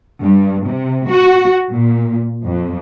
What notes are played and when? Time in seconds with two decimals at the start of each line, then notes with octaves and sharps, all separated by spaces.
0.21 G2
0.66 C3
1.07 F#4
1.71 A#2
2.45 F2